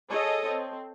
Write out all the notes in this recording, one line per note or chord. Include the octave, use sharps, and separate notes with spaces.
G#4 A4 C#5 D#5
C4